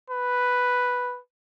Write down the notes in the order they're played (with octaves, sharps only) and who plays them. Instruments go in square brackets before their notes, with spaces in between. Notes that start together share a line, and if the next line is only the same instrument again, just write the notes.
[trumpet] B4